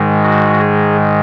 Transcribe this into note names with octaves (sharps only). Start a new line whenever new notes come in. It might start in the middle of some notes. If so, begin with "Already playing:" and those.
Already playing: G#2 D#3 G#3
F#4
G#4